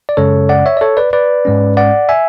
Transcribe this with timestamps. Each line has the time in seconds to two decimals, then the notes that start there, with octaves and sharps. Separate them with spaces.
0.09 D5
0.17 F#2 C#3 G#3 C#4 A4 C#5
0.49 D5 F#5
0.66 C#5 E5
0.77 D5
0.81 A4 C#5
0.97 B4 D5
1.13 B4 D5
1.45 G#2 G#3 C#4
1.77 D5 F#5
2.09 E5 G#5